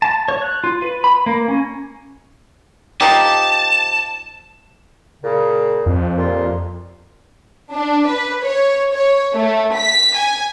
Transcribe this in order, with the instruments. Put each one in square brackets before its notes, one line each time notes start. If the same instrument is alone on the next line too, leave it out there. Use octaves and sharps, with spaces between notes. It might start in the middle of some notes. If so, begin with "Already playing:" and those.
[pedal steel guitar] A5
C#5
F#6
F4
B4
B5
A#3
C#4
[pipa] F3 D#4 G4 [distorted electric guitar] A5
[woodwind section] A#2 C#3
[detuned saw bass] F2
[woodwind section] C2 A#2 F4
[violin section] D4
B4
C#5
C#5
A3
B6
G#5